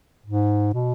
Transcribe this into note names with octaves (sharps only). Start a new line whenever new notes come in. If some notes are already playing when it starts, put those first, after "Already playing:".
G#2
B2